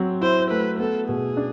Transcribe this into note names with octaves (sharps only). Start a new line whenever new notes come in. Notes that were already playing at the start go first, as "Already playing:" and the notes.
Already playing: F#3 C4
E4 C5
A3 B4
B3 A4
B2 G#4
D4